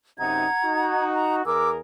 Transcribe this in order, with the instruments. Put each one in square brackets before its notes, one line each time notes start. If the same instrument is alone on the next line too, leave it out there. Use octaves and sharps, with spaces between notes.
[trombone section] F#2 C3 D#4 [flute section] F#5 A#5 G#6
[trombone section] D#4 F#4
[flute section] A#5
[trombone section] E2 G#4 A#4 [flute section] D6 E6